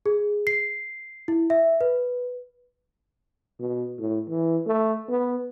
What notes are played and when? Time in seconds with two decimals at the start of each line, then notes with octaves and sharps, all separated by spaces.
0.06 G#4
0.47 C7
1.28 E4
1.50 E5
1.81 B4
3.60 B2
3.98 A2
4.28 E3
4.67 A3
5.09 B3